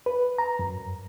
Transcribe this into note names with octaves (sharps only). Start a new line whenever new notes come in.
B4
A#5
F#2